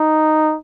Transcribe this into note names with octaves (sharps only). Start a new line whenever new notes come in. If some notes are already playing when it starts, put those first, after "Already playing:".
Already playing: D#4